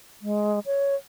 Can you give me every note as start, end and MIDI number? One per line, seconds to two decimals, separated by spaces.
0.22 0.59 56
0.66 0.95 73